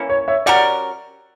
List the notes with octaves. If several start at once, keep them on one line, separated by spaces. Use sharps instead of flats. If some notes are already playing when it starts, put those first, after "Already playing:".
Already playing: E3 A#3 C#4
C#5
C#5 E5
G3 C#4 F#4 A#4 D5 F#5